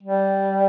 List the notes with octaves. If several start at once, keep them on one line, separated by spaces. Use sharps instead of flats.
G3